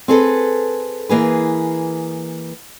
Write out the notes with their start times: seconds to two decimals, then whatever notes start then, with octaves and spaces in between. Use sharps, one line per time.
0.08 C4 G#4 A4 B4
1.09 E3 A#3 G#4 B4